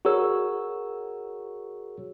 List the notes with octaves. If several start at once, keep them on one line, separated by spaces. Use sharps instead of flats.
F#4 G#4 A#4 C#5 E6